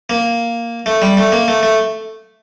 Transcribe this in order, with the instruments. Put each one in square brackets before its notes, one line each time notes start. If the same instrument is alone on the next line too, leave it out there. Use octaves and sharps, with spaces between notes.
[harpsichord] A#3
A3
G3
A3
A#3
A3
A3